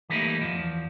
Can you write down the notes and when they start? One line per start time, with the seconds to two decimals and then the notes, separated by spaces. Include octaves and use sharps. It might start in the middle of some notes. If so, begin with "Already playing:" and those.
0.09 E3 G3 A3 A#3 D#4 E4
0.41 E2 G2 F3